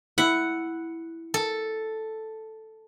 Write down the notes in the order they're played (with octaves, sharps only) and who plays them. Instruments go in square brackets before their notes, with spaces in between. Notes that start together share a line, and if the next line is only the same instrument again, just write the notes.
[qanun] E4 [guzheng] F#5
[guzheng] A4